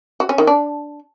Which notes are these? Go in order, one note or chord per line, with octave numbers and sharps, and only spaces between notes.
F#4
C#4
D#3
D4